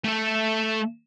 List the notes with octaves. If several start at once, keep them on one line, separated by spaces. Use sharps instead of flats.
A3 A4